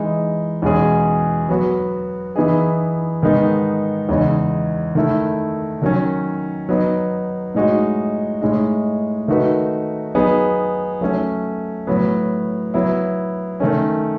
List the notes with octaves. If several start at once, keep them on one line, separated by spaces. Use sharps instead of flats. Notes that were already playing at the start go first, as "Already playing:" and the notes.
Already playing: E3 G#3 D#4
E2 B2 G#3 C#4 G#4
F#3 B3 F#4
E3 B3 D#4 G#4
G#2 D#3 G#3 B3 D#4
E2 C#3 G#3 D#4
D#3 A3 E4
D#3 F#3 C#4
F#3 B3 D#4
A2 G#3 D#4 F#4
A2 G#3 D#4
D#3 A3 D#4 F#4 B4
F#3 B3 D#4 G#4
F#3 A3 C#4
A2 F#3 B3
F#3 B3 E4
D#3 A3 C#4